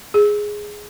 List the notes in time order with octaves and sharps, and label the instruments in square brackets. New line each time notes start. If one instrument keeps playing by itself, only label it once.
[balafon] G#4